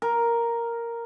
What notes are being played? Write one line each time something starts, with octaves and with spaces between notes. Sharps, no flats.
A#4